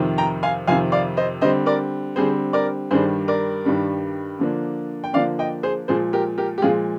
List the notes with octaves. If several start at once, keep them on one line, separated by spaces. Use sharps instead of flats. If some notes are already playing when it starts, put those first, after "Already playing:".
Already playing: F2 C3 D#3
G5 A#5
F5 G#5
F2 C3 D#3 F5 G#5
D5 F5
C5 D#5
D3 G3 C4 C5 D#5
A#4 D5
D3 G3 C4 G#4 C5
A#4 D5
G2 D#3 G3 D4 G#4 C5
A#4 D5
G2 D#3 G3 D4
D3 F3 A#3 D4
G5
D3 F3 A#3 D4 D5 F5
D#5 G5
G#4 C5
A#2 F3 G#3 G#4 C5
G4 A#4
G4 A#4
G4
A#2 F3 G#3 F4 G#4